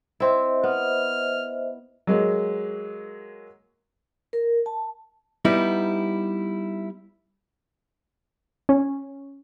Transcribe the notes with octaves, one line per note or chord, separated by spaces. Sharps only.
C4 E4 C5 D#5 E5
B3 F6
F#3 G#3 A#3
A#4
A5
G3 B3 D#4 E4
C#4